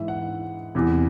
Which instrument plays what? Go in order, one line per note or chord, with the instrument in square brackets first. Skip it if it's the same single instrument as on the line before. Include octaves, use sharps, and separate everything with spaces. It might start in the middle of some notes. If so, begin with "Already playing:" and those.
Already playing: [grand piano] G#2 E3 E5
F#5
E2 C3 E3